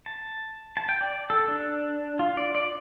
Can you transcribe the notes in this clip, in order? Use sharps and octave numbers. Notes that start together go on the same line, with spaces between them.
A5
A5
G5
D5
A4
D4
F4
D5
D5